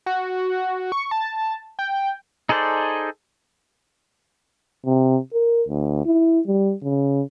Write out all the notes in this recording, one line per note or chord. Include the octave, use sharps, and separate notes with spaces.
F#4
C#6
A5
G5
D#4 G#4 A4 C5 D5
C3
A#4
D2
E4
G3
C#3